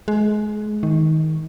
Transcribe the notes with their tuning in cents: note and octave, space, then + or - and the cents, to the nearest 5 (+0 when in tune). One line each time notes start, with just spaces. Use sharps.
G#3 +25
D#3 +20